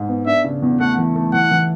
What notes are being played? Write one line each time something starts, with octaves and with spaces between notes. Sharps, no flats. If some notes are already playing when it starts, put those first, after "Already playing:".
Already playing: G#2 G#3
B3
D4 E5
C#3
E2
A3 F#5
E3
A3
E3 F#5
E3